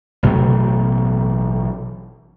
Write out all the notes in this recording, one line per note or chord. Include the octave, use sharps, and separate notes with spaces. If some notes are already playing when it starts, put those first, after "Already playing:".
A1 B2 F#3 A3